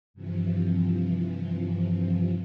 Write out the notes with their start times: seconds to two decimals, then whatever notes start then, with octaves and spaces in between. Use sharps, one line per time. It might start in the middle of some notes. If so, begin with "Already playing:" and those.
0.14 G2 C3 E3 F3